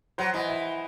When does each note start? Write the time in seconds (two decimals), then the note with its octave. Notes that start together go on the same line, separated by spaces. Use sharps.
0.18 F#3 C5
0.34 E3 D#5
0.48 E5